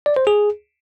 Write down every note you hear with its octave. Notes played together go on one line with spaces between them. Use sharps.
D5
C5
G#4